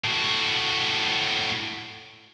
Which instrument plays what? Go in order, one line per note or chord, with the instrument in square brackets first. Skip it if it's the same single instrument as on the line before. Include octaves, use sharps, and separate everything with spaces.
[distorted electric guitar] A2 F#4